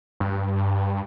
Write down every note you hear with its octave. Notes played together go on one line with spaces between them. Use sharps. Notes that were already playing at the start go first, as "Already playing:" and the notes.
G2